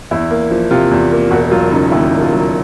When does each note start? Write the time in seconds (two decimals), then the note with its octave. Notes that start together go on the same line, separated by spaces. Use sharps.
0.11 E2 E4
0.31 A#3
0.51 F3
0.71 C3 F4
0.91 E2
1.12 A#3
1.31 E1 F#4
1.51 F#3 F4
1.71 C#3 D#4
1.91 D#2 E4
2.12 E1
2.21 F4
2.32 F#3